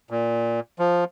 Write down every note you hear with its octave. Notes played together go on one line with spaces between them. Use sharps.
A#2
F3